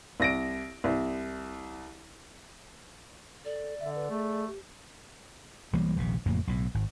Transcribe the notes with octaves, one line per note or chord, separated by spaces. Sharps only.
C2 A#6 D7
C2
A4 D5
D3 E5
B4
A3 G#4
G4
B1 E3 G3 A#3
D#1 A#1 C3
F#1 F2 A2 A#3
B1 A2
G#1